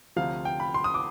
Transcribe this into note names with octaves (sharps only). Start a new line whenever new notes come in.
D2 C3 F3 F5
G5
B5
C6
D#6
D6